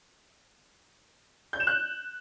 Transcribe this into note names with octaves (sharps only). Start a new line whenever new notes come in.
G6
E7
F#6